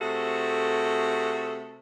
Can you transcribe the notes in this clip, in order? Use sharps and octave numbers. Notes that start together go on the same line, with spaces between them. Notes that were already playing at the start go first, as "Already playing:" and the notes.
C3 A3 F#4 G#4 A4